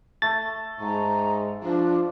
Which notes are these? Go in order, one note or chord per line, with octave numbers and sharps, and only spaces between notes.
A3 A6
G#2 A#5
F3 D4